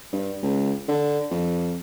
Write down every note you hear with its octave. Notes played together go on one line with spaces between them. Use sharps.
G2
C#2
D3
F2